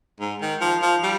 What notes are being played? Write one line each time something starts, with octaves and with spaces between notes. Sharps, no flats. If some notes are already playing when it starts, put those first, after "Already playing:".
G#2
D#3
F3
F3
G3